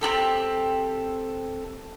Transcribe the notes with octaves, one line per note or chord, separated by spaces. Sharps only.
C4 F#4 G4 A4